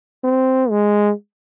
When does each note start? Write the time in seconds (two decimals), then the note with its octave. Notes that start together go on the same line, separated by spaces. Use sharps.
0.24 C4
0.70 G#3